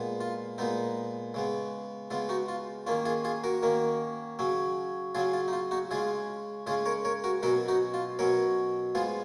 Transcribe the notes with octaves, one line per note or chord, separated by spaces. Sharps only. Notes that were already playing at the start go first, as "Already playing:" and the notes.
Already playing: A#2 G#3 B3
F4
A#2 G#3 B3 D#4
C#3 G#3 B3
C#3 G#3 B3 F4
D#4 F#4
F4
D#3 A#3 C#4 F4
F4 G#4
F4 G#4
F#4 A#4
D#3 A#3 C#4
C#3 F#3 C#4
C#3 F#3 C#4 F4 G#4
F4
D#4
F4
D#4 F#4
C#3 G#3 C#4 F4 G#4
C#3 G#3 C#4 F4 G#4
A#4 C#5
A#4 C#5
F#4 A#4
B2 F#3 C#4 F#4 A#4
D#4 F#4
F4
B2 F#3 C#4 A#4 C#5
F3 G#3 B3 F4 G#4